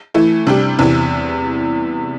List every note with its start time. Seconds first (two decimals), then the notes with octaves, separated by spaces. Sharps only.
0.14 E3 A3 E4
0.47 C3 G3 D4 G4
0.79 E2 C3 E3